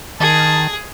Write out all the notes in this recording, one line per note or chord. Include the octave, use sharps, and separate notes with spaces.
D#3 G#4 A5